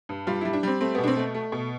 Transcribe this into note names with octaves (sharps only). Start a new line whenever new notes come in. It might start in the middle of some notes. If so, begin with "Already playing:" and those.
G2
G3 F4
G3 E4
D4
G3 C4
A3 C4
B2 B3
D4
C4
A3
A3
B2